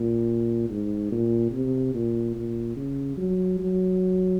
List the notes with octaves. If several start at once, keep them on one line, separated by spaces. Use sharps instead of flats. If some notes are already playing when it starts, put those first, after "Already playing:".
Already playing: A#2
G#2
A#2
C3
A#2
A#2
C#3
F#3
F#3